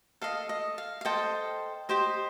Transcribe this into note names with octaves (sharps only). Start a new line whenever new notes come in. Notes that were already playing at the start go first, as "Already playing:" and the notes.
A4 D#5 F5
D#5
F5
F5
A4 C5 D#5 G5
G4 C5 D#5